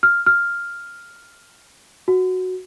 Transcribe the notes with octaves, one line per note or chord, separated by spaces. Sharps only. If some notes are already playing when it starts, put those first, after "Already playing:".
F6
F6
F#4